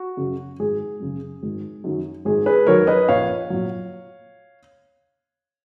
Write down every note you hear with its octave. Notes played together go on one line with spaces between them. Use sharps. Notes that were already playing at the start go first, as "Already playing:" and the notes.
Already playing: F#4
F#2 C#3 F#3
G#1 G#4
F#2 C#3 F#3
G#1
F#2 D#3 F#3
G#1 G#4
G#4 B4
F#2 D#3 F#3 A#4 C#5
B4 D#5
A#1 C#5 F5
A#2 F#3